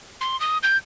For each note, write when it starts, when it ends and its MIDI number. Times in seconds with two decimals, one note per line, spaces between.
0.21 0.39 84
0.40 0.58 87
0.63 0.77 91